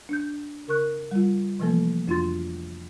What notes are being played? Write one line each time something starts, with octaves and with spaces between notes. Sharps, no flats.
D4 G6
C#3 A#4 C#6 F#6
G3 F4
C3 E3 F3 A3 A#3 A4
F2 D4 F4 F#4 C6 A6